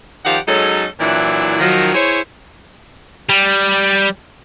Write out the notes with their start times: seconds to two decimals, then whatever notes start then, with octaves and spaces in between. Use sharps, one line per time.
0.25 D#3 F3 G4 D5 F5 F#5
0.47 F#3 G#3 C#4 D#4 A4
1.00 A#2 E3 F#3 D4 E4
1.60 D#3 F3 F#3
1.95 E4 G#4 C5 C#5
3.29 G3